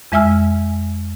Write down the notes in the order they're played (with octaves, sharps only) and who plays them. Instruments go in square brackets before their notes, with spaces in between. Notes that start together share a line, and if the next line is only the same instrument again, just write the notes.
[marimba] F2 G#3 E5 G#5 E6 F6